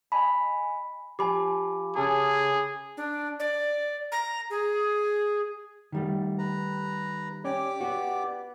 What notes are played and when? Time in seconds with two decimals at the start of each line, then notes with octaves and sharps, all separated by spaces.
0.12 D#5 G#5 B5
1.19 F3 G4 G#5 B5 D6
1.96 C#3 C#4 G#4 A4
2.97 D4
3.40 D5
4.12 A#5
4.50 G#4
5.92 D#3 G3 A3
6.39 B4 A#5
7.45 C#4 G4 D5 D6
7.80 B3 F#4